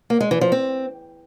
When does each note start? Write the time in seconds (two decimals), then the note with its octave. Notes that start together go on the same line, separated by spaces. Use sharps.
0.10 A#3
0.20 G#3
0.31 E3
0.41 F3
0.52 C4